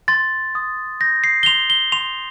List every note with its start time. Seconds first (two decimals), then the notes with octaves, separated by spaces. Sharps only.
0.08 C6 A6
0.55 D#6
1.01 G6 A#6
1.24 C7
1.43 G7
1.46 C6 F7
1.70 G7
1.92 C6 F7